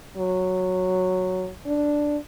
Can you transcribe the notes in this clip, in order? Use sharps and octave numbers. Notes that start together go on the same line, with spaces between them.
F#3
D4